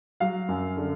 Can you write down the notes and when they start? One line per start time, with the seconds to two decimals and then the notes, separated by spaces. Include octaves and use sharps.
0.20 F#3 F5
0.49 F#2
0.77 D3